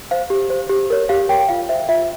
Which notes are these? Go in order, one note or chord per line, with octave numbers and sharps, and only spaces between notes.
C5 F5
G4
C5
G4
A#4 C#5
G4 F5
A#4 C#5 G5
F4 F5
C5 E5
F4 E5